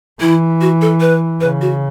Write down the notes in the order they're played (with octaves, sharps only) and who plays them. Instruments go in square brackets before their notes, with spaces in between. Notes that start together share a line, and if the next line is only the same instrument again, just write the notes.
[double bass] E3 [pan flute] E4
[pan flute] F#4
A4
B4
[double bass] C#3 [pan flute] B4
[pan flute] F#4